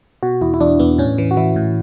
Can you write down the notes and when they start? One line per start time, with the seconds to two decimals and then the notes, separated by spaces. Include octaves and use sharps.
0.22 B2 F#4
0.41 E2 E4
0.54 E4
0.61 E2 D4
0.80 E2 B3
0.98 A2 C#4
1.18 E3
1.31 F#4
1.37 E3 E4
1.56 A2